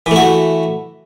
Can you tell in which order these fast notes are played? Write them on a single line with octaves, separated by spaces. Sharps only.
E3 A3 F#4